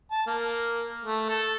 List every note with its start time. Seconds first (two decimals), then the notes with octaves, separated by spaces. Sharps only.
0.12 A5
0.27 A#3
1.04 A3
1.29 A4